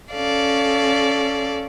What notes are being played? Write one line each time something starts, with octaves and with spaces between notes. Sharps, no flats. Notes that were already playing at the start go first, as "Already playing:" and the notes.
C#4 A4 D5 F5